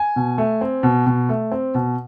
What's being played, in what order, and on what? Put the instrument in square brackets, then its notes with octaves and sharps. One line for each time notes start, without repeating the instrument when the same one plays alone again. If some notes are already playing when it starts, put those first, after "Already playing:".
Already playing: [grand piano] G#5
B2
A3
C4
B2
B2
A3
C4
B2